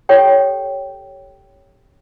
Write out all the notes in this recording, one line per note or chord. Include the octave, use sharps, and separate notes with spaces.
G4 A4 C#5 G5